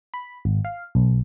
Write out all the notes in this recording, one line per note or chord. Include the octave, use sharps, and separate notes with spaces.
B5
G#1
F5
B1